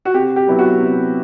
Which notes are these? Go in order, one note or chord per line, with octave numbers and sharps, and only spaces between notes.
F#4
C3 G4
G4
F#3 B3 E4
F#4
C3